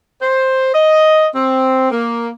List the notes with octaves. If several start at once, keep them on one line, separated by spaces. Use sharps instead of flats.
C5
D#5
C4
A#3